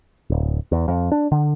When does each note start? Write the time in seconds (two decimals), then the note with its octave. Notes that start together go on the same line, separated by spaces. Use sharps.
0.30 D1
0.72 E2
0.88 F2
1.12 D4
1.32 D3